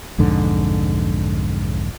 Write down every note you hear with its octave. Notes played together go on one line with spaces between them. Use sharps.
B1 F2 G#2 D3